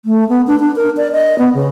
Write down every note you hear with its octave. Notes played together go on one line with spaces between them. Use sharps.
A3
B3
D4
D4
A#4
D5
D#5
B3
C#3